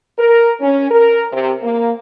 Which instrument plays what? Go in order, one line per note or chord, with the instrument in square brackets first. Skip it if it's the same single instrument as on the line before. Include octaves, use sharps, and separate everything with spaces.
[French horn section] A#4
C#4
A#4
C3
A#3